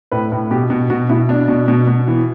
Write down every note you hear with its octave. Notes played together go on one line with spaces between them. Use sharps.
A2 B4
A2
B2 G4
B2
B2 F#4
B2 E4
B2 D4
B2
B2
B2
E3